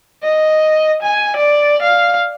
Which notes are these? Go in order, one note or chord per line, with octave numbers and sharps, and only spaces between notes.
D#5
G#5
D5
F5